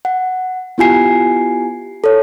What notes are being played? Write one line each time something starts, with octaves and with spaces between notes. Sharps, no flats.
F#5
B3 E4 F4 G4 G#5 C7
A4 C#5